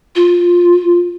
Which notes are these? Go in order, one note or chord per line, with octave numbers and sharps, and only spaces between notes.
F4